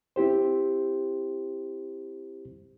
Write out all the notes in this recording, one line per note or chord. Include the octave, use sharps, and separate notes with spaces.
C4 E4 G4 C5